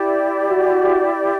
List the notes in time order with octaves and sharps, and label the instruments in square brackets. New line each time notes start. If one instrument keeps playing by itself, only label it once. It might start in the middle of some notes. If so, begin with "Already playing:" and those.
Already playing: [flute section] E4 G4 D5
[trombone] F#4